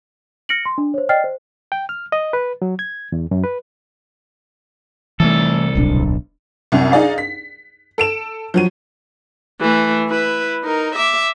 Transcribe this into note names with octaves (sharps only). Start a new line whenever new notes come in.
F6 A#6 C#7 D7 F#7
C6
D4
C5 C#5
D5 D#5 G5 F6 A6 C7
C5
G5
F6
D#5
B4
F#3
G#6
E2
F#2
B4
C2 E3 A3 A4
D1 B1 D4
C2 F#2
D4 D#4 G#4 D5 F5
B6
A4 D7 E7
F3 F#3 D#7
E3 A3
E4 B4
D#4 A#4
E5 D6